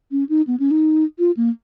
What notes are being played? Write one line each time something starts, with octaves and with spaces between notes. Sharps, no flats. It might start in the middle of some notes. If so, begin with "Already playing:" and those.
C#4
D#4
B3
C#4
D#4
F4
A#3